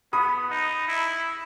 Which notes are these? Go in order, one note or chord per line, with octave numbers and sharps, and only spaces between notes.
B3 B5 D#6
D#4
E4